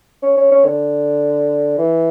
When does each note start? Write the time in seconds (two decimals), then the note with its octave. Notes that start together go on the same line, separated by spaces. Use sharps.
0.23 C#4
0.38 C#4
0.51 C#4
0.65 D3
1.78 E3